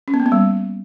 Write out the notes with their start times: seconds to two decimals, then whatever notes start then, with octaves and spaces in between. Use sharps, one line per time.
0.08 C#4
0.14 B3
0.20 A#3
0.26 B3
0.32 G3